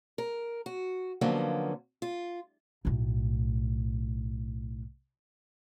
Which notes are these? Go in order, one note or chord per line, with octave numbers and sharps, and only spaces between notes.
A#4
F#4
D3 F3 F#3 A#3 B3 C#4
F4
B1 A2